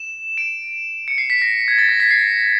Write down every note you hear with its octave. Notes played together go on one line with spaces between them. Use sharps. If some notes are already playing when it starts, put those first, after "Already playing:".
Already playing: E7
D7
C#7
C7
B6
A#6
G#6
A6
A#6
B6
C7